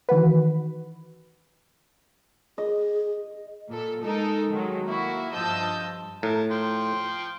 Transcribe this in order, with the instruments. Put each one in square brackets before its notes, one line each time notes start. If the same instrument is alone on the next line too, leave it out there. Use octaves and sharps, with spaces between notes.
[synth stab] D#3 E3 F#4 B4
[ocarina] G#4 [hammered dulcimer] D#5
[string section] A#2 A4
G#3 D#4 A4 A#4
D#3 F#3 G#3
A#3 E4 F#4
G2 F3 D#5 A5 E6 G6
[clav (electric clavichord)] A2 [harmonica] A#4 A5
[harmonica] F3 G5 C6